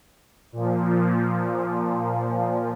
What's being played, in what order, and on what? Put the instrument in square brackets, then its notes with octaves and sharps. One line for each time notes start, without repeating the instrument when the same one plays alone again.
[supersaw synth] A#2 F3